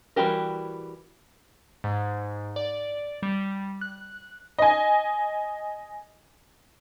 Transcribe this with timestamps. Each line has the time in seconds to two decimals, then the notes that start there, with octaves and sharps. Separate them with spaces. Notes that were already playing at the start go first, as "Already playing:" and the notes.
0.16 E3 G3 F#4 G4 A#4
1.84 G#2
2.56 D5
3.23 G3
3.81 F#6
4.58 D#5 G#5